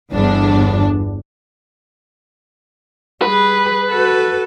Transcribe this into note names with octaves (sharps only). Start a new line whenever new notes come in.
G1 E2 D4
G3 G#4 B4
F#4 A4